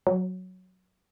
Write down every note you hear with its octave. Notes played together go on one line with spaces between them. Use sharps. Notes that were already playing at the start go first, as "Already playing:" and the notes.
F#3